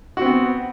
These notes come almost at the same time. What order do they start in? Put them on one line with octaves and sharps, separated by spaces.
F#4 C4 B3